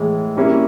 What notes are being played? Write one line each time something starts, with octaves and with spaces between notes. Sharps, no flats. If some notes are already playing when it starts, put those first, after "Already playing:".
Already playing: A2 E3 G#3
B2 G3 A#3 C#4 E4